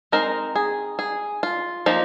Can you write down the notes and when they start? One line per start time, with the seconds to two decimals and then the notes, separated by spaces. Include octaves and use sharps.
0.12 G#3 C4 D#4 A#4
0.56 G#4
0.99 G#4
1.43 F4
1.86 F3 A#3 D#4